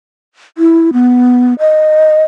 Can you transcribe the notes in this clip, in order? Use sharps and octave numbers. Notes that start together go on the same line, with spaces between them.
E4
B3
D#5